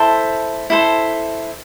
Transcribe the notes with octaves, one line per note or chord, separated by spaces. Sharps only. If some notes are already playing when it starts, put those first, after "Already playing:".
Already playing: E4 A4 C5 A5
E4 A4 C5